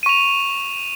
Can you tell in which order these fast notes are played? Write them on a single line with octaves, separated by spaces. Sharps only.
D#7 C#6 F7